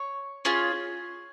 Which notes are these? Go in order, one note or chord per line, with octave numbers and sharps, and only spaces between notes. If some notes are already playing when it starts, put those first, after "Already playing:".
Already playing: C#5
C#4 F4 G#4